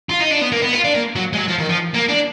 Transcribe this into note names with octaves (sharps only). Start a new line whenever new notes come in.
F4
D#4
D4
B3
A#3
B3
F4
D4
A#3
F#3
G#3
F#3
F3
D#3
F3
A#3
D4